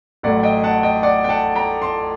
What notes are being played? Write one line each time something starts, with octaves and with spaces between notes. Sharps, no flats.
A1 A2 F#3 D5 F#5
D#5 G5
F#5 A5
D#5 G5
D5 F#5
G5
F#5 A5
G5 A#5
A5 C6